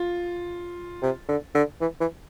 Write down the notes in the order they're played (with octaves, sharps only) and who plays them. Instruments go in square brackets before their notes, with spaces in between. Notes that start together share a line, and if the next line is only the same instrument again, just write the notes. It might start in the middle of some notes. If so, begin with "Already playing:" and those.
Already playing: [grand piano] F4
[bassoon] C3
D3
D3
E3
E3